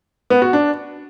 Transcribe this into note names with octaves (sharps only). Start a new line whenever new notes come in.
B3
F#4
D4